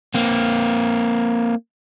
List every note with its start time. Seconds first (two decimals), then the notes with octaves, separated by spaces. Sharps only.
0.14 A#3 C4